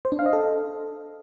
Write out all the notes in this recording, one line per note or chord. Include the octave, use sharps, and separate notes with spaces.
C5
D4
F5
D#5
A4